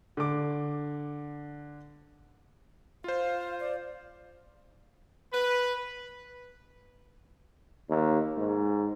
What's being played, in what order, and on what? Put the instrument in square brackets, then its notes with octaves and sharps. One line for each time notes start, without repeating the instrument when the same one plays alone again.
[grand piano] D3 D6
[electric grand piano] F4 C5 [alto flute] F5
[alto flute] D5
[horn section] B4
[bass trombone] D#2
G#2